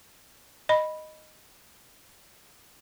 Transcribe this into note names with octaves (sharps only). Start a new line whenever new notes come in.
D#5 B5